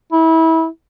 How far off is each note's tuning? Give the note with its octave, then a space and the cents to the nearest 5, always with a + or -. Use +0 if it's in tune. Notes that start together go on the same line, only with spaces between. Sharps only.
E4 -25